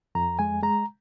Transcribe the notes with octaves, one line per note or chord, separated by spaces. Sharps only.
F2 A#5
G#3 G#5
G#3 A#5